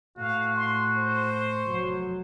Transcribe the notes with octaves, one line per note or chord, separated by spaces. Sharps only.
A2 F#4 F5
C6
C5
C#6
F1 F#3